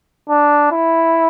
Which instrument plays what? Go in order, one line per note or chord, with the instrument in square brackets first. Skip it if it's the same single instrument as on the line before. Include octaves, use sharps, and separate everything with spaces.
[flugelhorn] D4
E4